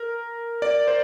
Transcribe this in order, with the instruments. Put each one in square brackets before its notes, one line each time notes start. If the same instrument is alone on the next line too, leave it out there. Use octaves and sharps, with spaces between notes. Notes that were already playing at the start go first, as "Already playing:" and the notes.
Already playing: [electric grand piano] A#4
D5
C5